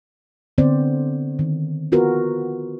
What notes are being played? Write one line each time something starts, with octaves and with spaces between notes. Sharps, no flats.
D3 B3 C4 C5 D5
D#3
B3 F4 F#4 A#4 B4